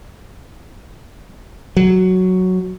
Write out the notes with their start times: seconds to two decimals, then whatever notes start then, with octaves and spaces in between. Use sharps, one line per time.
1.77 F#3